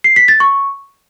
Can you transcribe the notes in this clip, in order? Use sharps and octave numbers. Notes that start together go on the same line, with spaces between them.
C7
B6
A6
C#6